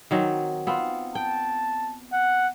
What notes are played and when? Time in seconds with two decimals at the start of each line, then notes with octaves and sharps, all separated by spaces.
0.11 D#3 F#3 C4
0.67 B3 C4 F4
1.15 G5 A5
2.13 F#5